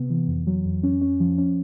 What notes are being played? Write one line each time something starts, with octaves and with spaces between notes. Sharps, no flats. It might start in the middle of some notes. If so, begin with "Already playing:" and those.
Already playing: C3 B3
E3
F2
F#3
F2
C#4
C#4
F3
C#4